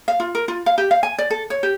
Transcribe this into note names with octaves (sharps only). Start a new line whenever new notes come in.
F5
F4
A#4
F4
F5
G4
F5
G#5
D5
A4
C#5
G4